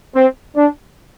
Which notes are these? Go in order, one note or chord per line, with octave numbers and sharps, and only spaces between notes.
C4
D4